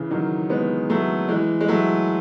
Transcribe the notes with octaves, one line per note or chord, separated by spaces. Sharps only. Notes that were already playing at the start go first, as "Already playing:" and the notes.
Already playing: C#3 E3
D#3 F#3
G#3 B3
F#3 A3
E3 G#3
G#3
F#3 A3